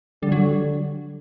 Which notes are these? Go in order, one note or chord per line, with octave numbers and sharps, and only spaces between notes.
D3 G3
F#3
G3
F#3